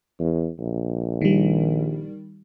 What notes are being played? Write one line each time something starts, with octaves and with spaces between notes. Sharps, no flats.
E2
A#1
D#3 G3